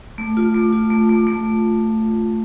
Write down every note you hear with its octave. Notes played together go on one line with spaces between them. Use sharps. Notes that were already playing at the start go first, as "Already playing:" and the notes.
A3
F4
A3
F4
A3
A3
A3